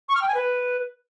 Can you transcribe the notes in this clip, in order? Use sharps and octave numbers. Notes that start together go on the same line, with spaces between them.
C#6
F6
G5
G#5
B4